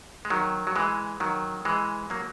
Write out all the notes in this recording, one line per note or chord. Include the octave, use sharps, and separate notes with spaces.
G#3
D#3 F#3
F#3
E3 G#3
D#3 F#3
E3 G#3
F#3 A#3